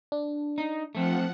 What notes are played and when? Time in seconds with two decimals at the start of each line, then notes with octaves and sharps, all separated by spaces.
0.12 D4
0.58 D#4
0.95 F3 A3 C4 F#5